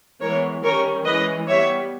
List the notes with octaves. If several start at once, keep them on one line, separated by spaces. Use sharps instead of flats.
E3 G#3 B3 A#4 C#5
D#3 G3 C#4 A#4 C#5
E3 G#3 C#4 B4 D#5
G3 B3 C#5 E5